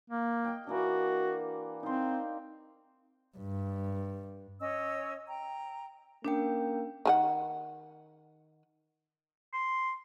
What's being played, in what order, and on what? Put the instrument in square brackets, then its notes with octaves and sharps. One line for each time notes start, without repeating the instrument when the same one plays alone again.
[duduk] A#3
[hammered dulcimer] D#5 G5
[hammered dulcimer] E3 A#3 D4 [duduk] F#4
[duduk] C4 [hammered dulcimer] D#4 F5 C6
[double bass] G2
[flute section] C#4 C#5 D#5 E6
G5 A#5
[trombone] A#3 [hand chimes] C#4 A#4 G5 [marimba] D4
[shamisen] D#3 G#4 F#5
[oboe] C6